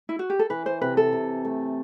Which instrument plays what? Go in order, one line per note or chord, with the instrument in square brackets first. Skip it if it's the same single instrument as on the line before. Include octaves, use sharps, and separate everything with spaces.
[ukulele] E4
F#4
G4
A4
[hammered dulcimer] E3 [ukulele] B4
[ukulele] C5
[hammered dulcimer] C3 [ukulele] B4
[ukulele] A4
[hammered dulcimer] C3
A3